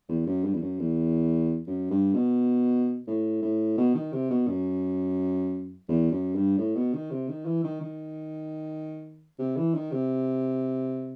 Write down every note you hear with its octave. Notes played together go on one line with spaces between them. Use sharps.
E2
F#2
G2
E2
F#2
E2
F#2
G2
B2
A2
A2
B2
D#3
C3
B2
F#2
E2
F#2
G2
A2
B2
D#3
C3
D#3
E3
D#3
D#3
C3
E3
D#3
C3